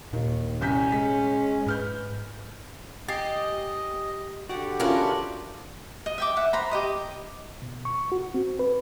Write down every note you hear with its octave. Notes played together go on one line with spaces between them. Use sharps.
D#2 A#2 D#3
C2 C#4 G6 B6
G#3 B6
G#2 B4 F6 G6
G4 D#5 G#5 A6 C7
D3 F#4 G4 D5 F#5
E3 B3 C#4 D4 F4 F#4 A#4 F5
D#5
E5 G5 D6
E5 F#5
C5 A#5 B5
G4 D#5 D#6
B2
C#6
F#4
C4
B4